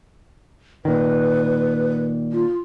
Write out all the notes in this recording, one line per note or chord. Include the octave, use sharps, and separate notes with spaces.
A#2 D#3 B4
F4